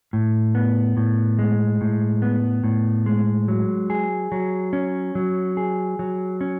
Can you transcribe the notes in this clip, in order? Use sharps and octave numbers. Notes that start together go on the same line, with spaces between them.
A2
B3
A2
G#3
A2
B3
A2
G#3
F#3
G#4
F#3
C#4
F#3
G#4
F#3
C#4